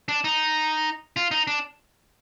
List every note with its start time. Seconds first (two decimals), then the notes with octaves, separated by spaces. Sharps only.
0.09 D4
0.24 D#4
1.17 F4
1.31 D#4
1.47 D4